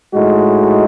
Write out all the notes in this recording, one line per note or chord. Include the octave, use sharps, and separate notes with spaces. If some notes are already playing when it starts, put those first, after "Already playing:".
A2 G#3 D#4 F#4